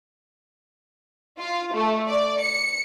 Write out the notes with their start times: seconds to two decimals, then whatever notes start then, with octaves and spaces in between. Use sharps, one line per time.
1.38 F4
1.74 A3
2.08 D5
2.40 C#7